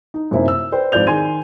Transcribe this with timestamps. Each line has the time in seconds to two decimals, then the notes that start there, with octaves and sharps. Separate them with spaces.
0.14 D#4
0.31 F#2 C3 A#3 C4 D#4 E4
0.48 E6
0.72 B4 C5 D5 G5
0.92 G#1 F3 D5 G6 F7
1.07 D#3 G#4 G#5 C6 G#6 D#7